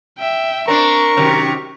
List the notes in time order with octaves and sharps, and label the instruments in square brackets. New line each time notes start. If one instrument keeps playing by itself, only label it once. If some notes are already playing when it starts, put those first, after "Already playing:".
[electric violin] E5 G5
[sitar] C4 D4 [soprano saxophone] A#4 [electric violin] C#6
[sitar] F#2 C3 D#3